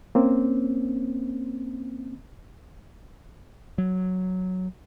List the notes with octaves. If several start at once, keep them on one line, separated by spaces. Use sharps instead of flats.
A#3 C4 C#4
F#3